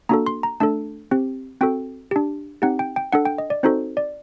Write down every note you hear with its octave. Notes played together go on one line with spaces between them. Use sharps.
A#3 D4 F#4 A4 A#5
C6
A#5
A3 D4 A4 A5
C4 G4
C4 F#4 A4 G5
D4 G4
C4 D#4 G4 F#5
G5
G5
D4 A4 F#5
G5
D#5
D5
C4 D#4 F#4 A4 C5
D5